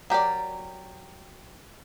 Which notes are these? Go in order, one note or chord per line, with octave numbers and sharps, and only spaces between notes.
F#3 G4 A#4 D5